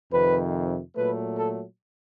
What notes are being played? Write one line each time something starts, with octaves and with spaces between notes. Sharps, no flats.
F2 C3 D#3 B4
A#2 F#3 A3 B4
A4